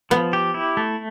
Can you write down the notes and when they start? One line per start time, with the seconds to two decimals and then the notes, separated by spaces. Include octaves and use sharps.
0.10 F3 B3
0.33 G4
0.54 E4
0.77 A3